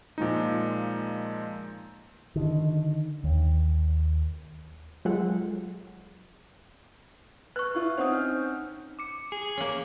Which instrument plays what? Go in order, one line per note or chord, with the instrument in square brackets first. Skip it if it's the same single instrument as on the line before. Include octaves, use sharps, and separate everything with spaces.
[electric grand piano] A#2 F3 G#3 D#4
[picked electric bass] D3 D#3
D#2
[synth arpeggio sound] F#3 G#3 F4 G#4 A4 F#5
[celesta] B4 C#6 [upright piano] F#6
[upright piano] E4 F4
[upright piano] C4 C#4 D#4 [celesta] C5 F#5 D#6
[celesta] F6 G6
[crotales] D6 C#7
[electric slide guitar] G#4
[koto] A#3 C#4